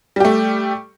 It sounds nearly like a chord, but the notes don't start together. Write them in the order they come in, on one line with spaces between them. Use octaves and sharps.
G3 G4 A3